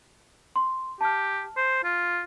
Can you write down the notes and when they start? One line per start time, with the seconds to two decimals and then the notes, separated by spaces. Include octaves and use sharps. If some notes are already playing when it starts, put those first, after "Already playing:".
0.56 C6
1.01 G4 A5 F6
1.57 C5
1.84 F4